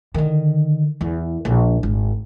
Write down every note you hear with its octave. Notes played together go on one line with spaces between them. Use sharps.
D3 D#3
E2
A#1
G#1